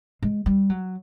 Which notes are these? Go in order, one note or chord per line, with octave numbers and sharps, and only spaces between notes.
G#3
G3
F#3